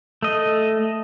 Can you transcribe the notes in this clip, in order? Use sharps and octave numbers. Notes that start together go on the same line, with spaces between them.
A3 D#5